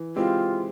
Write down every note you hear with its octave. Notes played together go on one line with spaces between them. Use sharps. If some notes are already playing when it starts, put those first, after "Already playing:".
Already playing: E3
G#3 C4 E4 F4 G4